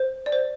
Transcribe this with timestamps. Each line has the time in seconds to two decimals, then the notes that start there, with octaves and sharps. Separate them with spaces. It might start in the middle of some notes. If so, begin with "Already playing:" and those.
Already playing: C5
0.26 D5
0.32 C5